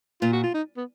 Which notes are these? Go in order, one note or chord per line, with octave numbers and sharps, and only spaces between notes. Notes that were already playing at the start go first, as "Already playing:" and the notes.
A#2 F4
F#4
F4
D#4
B3